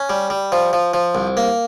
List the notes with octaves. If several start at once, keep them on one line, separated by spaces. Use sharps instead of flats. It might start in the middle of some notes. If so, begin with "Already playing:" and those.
Already playing: C#4
G3
G3
F3
F3
F3
C2
A#3